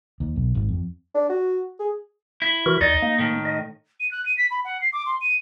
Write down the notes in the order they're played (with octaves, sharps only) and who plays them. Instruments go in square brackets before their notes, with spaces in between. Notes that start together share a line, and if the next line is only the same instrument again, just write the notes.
[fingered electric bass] D#2
B1
G#1
F2
[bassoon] D4
F#4
G#4
[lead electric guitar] E4
[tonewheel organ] E3 F#4 A#4
[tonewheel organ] D#2 D5 [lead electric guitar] D#4
[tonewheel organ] A#3
[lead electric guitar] A2 D#3
[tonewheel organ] D#5
[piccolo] D#7
F#6
D#7
B6
B5
F#5
C7
D6
C6
D#7